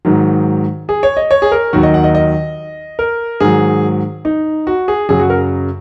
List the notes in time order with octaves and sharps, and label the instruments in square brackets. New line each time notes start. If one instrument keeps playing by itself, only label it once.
[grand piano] G#2 D#3 F#3
G#4
C#5
D#5
C#5
G#4
A#4
D#2 D#3 F#3 F#4
D#5
F#5
D#5
D#5
A#4
G#2 D#3 F#3 G#4
D#4
F#4
G#4
F#2 C#3 F#3 G#4
F#4
A#4